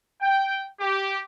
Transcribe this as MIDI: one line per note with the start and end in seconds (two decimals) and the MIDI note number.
0.22 0.61 79
0.80 1.17 67